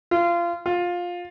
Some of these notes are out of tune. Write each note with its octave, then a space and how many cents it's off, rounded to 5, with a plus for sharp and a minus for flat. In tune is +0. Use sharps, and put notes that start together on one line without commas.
F4 -25
F4 +15